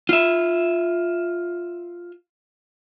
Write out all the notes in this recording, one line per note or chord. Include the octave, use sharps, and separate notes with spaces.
F4 E5